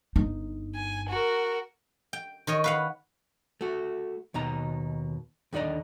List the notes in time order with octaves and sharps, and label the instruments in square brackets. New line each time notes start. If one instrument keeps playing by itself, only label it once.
[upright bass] G1 D#4
[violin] G#5
F#4 A#4
[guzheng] G5
D#3 C#5 D#5
B4 F5 F#5
[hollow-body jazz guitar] A3 F#4
D#2 B2 D#4 A#5
D#2 D3 D#4 D5 D#5